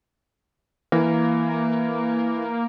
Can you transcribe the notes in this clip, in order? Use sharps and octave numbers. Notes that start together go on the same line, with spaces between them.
E3 A#3